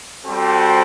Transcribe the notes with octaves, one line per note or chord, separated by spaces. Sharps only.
G3 C4 F#4 A4 C5